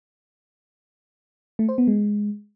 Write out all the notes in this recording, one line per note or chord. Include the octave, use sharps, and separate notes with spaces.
A3
C5
B3
G#3